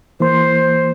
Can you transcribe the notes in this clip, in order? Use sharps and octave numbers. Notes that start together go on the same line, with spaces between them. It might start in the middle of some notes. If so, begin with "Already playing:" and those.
E3 A#3 C5 C6